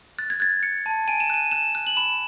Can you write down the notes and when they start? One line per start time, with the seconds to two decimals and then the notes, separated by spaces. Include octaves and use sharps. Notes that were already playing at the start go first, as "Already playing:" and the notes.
0.19 F#6 A6
0.30 G#6
0.40 F#6 A6
0.63 F#6 C#7
0.86 A5
1.08 G#5 D#7
1.20 E7
1.30 F#6 D#7
1.51 F#6 E7
1.75 F#6
1.87 F#7
1.97 B5 E7